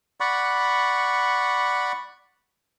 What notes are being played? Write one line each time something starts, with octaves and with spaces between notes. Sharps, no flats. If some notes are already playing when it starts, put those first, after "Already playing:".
D5 F#5 B5 C#6